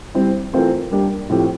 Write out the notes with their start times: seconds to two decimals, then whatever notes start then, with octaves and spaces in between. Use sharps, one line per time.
0.15 G3 C4 E4
0.53 E3 A3 C4 F4 A#4
0.91 G3 A#3 D4 G4
1.29 A2 F3 C4 G4